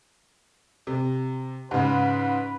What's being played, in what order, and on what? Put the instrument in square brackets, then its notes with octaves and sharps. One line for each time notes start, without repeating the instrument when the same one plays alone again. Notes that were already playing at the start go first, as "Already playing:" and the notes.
[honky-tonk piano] C3
[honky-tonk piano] G#2 C#3 [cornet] B4